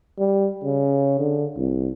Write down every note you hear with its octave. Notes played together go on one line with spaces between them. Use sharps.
G3
C#3
D3
C2